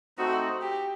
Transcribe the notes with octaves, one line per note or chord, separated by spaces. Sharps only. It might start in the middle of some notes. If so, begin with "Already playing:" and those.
A3 C4 D#4 F#4
G4